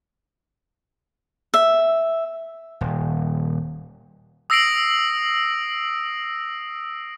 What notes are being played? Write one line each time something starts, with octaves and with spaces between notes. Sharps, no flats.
E5
D#1
D#6 E6 A#6 C7 D7 F#7